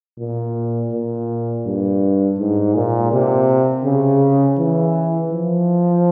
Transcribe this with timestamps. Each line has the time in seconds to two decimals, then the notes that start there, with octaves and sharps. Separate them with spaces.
0.19 A#2
0.92 A#2
1.66 G2
2.39 G#2
2.75 A#2
3.12 C3
3.85 C#3
4.59 E3
5.32 F3